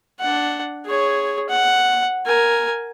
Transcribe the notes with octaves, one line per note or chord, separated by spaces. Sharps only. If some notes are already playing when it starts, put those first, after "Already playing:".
D4 F#5
G#4 C#5
F#5
A#4 G#5